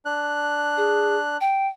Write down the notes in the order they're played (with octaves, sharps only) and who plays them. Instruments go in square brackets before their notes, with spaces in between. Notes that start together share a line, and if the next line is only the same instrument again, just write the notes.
[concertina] D4 F#6
[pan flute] G#4
G5